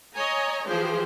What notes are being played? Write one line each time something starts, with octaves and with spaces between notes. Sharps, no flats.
C#5 D#5 G#5 A#5
E3 F3 G4 G#4 C5